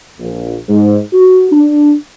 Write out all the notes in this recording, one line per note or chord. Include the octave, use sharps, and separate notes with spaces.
A#1
G#2
F#4
D4